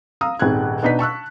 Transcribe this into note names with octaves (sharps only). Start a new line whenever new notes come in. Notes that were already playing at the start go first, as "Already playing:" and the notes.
F5 A#5 D#6 E6
D#1 G#1 G#4 F#6 G#6
B2 D4 D#4 B4 B6
A5 C#6 E6 F#6